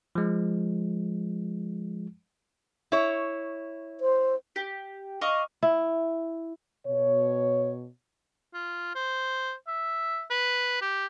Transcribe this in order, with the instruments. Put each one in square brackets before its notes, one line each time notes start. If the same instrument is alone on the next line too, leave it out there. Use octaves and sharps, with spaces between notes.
[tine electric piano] F3 G#3
[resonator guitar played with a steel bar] E4 C#5
[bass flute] C5
[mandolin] G4
D#5 F5 C#6 D6
[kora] E4
[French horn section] B2 C#5
[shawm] F4
C5
E5
B4
G4